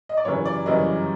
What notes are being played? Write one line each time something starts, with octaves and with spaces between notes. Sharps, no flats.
D#5
D5
G1 F#2 C#3 E3 G3 C#5
D5
G1 F#2 C#3 E3 G3 D#5